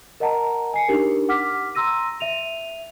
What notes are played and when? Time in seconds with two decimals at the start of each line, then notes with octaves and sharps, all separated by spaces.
0.20 A#4 D#5 F#5 A5 A#5
0.74 G#5 C7 C#7
0.88 D4 D#4 G4 A#4
1.29 F#5 D6 F6 B6
1.75 A#5 C6 E6 A#6 D#7
2.20 E5 D#7 F7